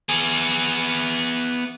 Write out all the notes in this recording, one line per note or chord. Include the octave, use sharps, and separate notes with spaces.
B3 G#4